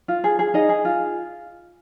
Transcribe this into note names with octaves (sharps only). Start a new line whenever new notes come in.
F4
G#4
G#4
D#4 G#4 D#5
G#4
F4